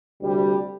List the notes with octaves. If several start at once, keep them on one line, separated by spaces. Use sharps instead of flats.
D2 C3 G3